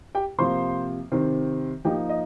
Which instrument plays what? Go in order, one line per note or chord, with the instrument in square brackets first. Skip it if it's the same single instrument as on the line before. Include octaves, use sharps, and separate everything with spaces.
[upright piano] G4 G5
C3 F3 A#3 C5 C6
C3 D#3 C4
F3 A#3 D#4 G4 G5
D#5